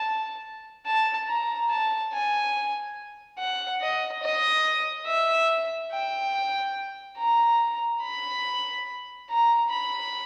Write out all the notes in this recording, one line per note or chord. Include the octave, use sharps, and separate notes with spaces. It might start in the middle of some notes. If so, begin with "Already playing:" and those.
Already playing: A5
A5
A#5
A5
G#5
F#5
D#5
D#5
E5
G5
A#5
B5
A#5
B5